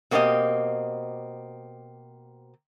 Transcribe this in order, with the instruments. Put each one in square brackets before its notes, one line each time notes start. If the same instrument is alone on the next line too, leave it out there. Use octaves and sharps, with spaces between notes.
[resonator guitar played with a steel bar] B2 A#3 C4 C#4 G4 D#5